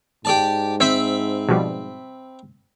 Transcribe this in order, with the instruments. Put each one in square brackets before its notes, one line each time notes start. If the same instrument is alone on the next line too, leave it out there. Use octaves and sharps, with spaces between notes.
[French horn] G#2 [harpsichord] G4 D5 A5
[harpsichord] C4 E5 B5 [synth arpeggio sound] C5
[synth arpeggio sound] B2 F3 G3